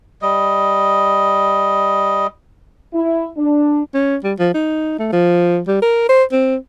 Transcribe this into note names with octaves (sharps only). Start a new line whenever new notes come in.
G3 D#5
E4
D4
C#4
G3
F3
D#4
A3
F3
G3
A#4
C5
C4